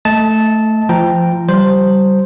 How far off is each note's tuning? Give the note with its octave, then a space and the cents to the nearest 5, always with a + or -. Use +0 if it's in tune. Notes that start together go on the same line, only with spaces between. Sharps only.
A3 +0 D#5 +30 A5 -10
F3 -25 G5 +0 A#5 +0
G3 -25 C5 +0